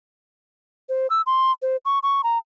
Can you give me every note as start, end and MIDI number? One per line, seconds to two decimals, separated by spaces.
0.89 1.07 72
1.10 1.22 88
1.26 1.51 84
1.62 1.76 72
1.85 1.99 85
2.03 2.21 85
2.24 2.38 82